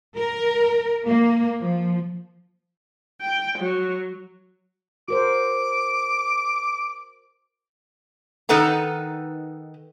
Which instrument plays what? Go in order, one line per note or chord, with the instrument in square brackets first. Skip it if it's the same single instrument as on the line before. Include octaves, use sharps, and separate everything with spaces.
[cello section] A#4
A#3
F3
[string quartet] G5
F#3
[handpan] F#4 A#4 C5 [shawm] D6
[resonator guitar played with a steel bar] D#3 D#4 A4 B4 F#5 A#5